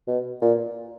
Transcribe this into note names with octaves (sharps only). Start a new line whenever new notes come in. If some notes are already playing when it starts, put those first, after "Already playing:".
B2
A#2